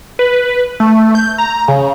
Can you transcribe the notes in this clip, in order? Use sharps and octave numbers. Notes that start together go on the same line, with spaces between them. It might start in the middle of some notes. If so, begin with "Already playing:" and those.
B4
A3
G6
A#5
C#3